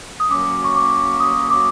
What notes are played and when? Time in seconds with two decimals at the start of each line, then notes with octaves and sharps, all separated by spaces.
0.20 D#6
0.30 F#3 A#3 C#4 D6
0.64 C#6
0.76 D6
1.20 D#6
1.50 D6